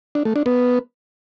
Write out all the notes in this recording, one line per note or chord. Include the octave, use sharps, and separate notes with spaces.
D4
A3
D4
B3